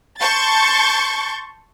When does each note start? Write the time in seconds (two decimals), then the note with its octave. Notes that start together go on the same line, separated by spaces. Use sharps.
0.20 A5 C6 C#6 G6 A6